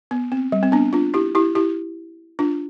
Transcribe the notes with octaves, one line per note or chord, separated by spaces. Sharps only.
B3
C4
G3
C4
B3 D4
D4 F4
E4 G4
E4 G4
E4 G4
D4 F4